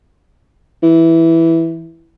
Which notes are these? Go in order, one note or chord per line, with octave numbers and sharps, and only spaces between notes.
E3